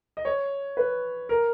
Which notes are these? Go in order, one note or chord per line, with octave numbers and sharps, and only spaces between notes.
D#5
C#5
B4
A#4